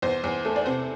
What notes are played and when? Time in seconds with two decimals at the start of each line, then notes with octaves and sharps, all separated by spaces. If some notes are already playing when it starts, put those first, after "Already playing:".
0.02 E2 C5
0.24 E2
0.45 A3
0.56 D5
0.66 C3 C5